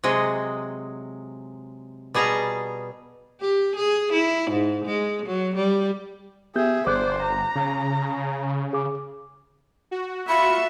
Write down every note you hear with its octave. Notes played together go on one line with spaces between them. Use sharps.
C3 F#3 G#3 D#5
B2 G3 G#4 A5 A#5
G4
G#4
E4
G#2
G#3
F#3
G3
B3 G4 G#4 E5 G6
G1 C5 D5 D6 F#6
A#5
C#3
G#4 D6
F#4
F4 F#4 E5 B5 C#7